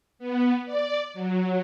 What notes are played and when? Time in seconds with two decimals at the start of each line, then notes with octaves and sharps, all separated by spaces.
0.19 B3
0.66 D5
1.14 F#3